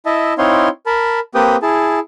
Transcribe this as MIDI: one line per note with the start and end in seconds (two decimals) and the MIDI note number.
0.06 0.33 64
0.06 0.33 75
0.06 0.33 76
0.06 0.33 81
0.38 0.69 60
0.38 0.69 63
0.38 0.69 64
0.38 0.69 73
0.38 0.69 77
0.38 0.69 84
0.86 1.20 70
0.86 1.20 81
0.86 1.20 83
1.35 1.56 58
1.35 1.56 60
1.35 1.56 67
1.35 1.56 71
1.35 1.56 79
1.35 1.56 87
1.62 1.99 64
1.62 1.99 68
1.62 1.99 81